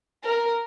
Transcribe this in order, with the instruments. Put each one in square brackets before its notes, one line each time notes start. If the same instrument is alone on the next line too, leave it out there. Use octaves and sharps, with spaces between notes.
[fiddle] A#4